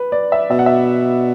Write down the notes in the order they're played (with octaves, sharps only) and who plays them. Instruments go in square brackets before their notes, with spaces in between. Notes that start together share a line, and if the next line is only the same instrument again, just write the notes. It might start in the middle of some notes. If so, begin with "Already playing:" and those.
Already playing: [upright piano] B4
D5
E5
[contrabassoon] B2 [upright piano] E5
[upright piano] F#5
E5